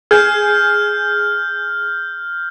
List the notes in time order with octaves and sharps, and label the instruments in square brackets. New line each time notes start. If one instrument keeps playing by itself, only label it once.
[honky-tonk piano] G#4 [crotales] F6 G6